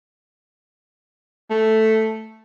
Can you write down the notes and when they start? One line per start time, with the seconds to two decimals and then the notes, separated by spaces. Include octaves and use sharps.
1.50 A3